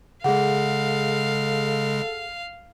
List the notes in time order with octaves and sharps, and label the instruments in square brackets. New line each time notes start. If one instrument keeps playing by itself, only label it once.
[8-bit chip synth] C#3 G#3 [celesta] G#4 F#5 [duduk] A4 [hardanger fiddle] F5